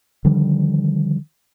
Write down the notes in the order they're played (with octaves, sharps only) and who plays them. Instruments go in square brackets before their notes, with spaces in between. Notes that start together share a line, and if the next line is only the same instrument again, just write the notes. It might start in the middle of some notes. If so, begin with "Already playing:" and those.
[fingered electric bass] D3 D#3 F3 G3